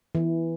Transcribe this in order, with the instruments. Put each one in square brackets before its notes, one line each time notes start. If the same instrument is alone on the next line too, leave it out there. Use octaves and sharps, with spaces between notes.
[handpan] E3